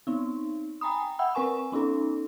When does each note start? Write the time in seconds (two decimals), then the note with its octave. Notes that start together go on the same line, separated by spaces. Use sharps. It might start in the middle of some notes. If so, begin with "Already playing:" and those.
0.07 B3 C4 D#4
0.81 G5 G#5 A#5 B5 D#6
1.19 E5 F#5 G5 B5 E6
1.34 C4 A#4 B4 G#5 C#6 E7
1.72 B3 C#4 D#4 A4